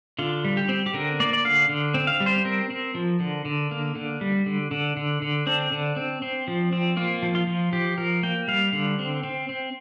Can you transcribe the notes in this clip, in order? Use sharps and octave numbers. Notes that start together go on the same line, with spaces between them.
D3 F4
G3
G4
C4
G4
D3 A#4
A#3 D5
D5
D3 F5
D3
C4
F5
G3
C5
C4 A#4
C4
F3
D3
D3
A#3
D3
G3
D3
D3
D3
D3
C4 D4
D3
C4
C4
F3
C4
A#3 F4
F3
F4
F3
F3 G4
F3 A#4
A#3 G5
G3 F5
D3
C4
C4
C4